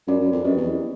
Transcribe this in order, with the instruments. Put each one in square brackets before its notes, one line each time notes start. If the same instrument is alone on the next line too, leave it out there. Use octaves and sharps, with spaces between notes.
[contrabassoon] F#2 [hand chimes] D4 F4 A#4 D5
[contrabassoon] F#2
F2
[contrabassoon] F#2 [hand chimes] G4 B4 D#5
[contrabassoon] E2